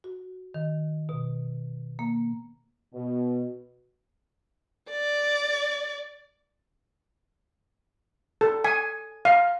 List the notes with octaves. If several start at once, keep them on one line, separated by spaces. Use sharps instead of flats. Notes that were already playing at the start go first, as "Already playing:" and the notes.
F#4
D#3
B2
A#3
B2
D5
A4
G#5
F5